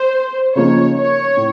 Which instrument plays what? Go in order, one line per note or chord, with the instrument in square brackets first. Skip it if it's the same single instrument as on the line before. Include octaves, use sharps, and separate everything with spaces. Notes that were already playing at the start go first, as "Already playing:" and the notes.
Already playing: [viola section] C5
[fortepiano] C#3 F3 A#3 D#4 [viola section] C#5
[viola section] C#5
[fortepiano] A2